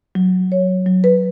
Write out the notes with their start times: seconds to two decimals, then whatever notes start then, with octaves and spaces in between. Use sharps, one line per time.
0.15 F#3
0.52 C#5
0.86 F#3
1.04 B4